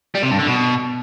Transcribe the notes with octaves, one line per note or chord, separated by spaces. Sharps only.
G3
C3
G2
D3
B2